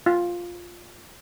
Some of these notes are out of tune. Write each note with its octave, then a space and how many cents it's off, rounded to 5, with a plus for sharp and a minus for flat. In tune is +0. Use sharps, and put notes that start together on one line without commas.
F4 +0